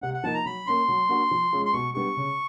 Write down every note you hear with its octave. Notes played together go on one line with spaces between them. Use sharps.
C3 F#5
F#5
F3 A#3 D#4 A5
A#5
F#3 B5
A#3 C#4 C6
F#3
A#3 D4 F#4 A#4
F3
G#3 C#4 F4 G#4
C6
B2 C#6
G3 B3 D4 G4 C#6
C#3